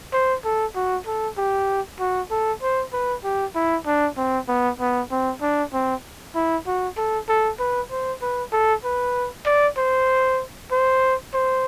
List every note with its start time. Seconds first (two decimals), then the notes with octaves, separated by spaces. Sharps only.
0.13 C5
0.44 A4
0.76 F#4
1.07 A4
1.37 G4
2.00 F#4
2.31 A4
2.62 C5
2.93 B4
3.24 G4
3.55 E4
3.87 D4
4.17 C4
4.48 B3
4.80 B3
5.11 C4
5.42 D4
5.73 C4
6.35 E4
6.67 F#4
6.97 A4
7.29 A4
7.60 B4
7.91 C5
8.22 B4
8.53 A4
8.84 B4
9.46 D5
9.77 C5
10.72 C5
11.34 C5